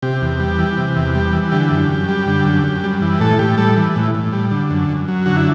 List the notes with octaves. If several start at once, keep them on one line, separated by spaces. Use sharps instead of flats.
C3 G4
E2
G3
E3
C3
E2
G3
E3
D3 G4
F#2
F#2
G3
D3
F#2
F#2
G3
E3
A2 A4
A2 G4
G3 A4
E3
A2
A2
G3
D3
F#2
F#2
F#3
D3 F#4
E4